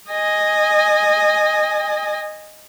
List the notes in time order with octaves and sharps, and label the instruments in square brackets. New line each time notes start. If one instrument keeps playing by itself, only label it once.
[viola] D#5 G#5